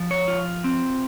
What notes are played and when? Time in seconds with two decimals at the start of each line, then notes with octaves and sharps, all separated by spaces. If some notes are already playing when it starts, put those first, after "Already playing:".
Already playing: F3
0.11 C#5
0.28 F4
0.64 C4